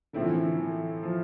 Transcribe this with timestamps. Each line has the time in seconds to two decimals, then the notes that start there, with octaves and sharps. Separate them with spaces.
0.13 A2 D3 F3 C4 E4
0.25 E3
0.37 D3
0.58 E3
1.03 F3